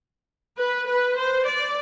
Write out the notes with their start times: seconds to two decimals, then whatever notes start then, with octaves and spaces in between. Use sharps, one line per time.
0.58 B4
0.87 B4
1.16 C5
1.46 D5